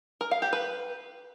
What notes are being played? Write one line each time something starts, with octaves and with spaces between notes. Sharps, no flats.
A#4
F5
G4
B4